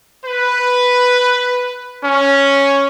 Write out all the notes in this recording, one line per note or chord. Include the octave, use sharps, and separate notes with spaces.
B4
C#4